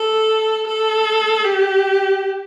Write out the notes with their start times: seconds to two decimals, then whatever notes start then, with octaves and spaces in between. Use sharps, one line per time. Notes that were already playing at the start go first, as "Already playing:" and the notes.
Already playing: A4
0.67 A4
1.45 G4